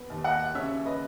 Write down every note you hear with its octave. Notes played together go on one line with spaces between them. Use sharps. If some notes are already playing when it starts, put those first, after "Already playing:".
Already playing: B3
D#2
D#5 F#5
C#3 C#5 E5
B4 D#5